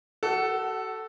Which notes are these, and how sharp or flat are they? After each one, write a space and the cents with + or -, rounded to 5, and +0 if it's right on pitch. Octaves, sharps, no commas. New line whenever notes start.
F#4 +40 A4 +0 F#5 +20